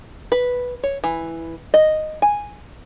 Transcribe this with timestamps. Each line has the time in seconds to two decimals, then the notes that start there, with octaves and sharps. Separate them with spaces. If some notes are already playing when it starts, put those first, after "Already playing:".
0.32 B4
0.83 C#5
1.04 E3
1.74 D#5
2.22 G#5